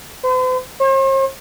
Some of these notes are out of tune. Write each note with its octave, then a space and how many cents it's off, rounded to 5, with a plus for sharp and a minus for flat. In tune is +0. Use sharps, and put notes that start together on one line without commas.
C5 -45
C5 +45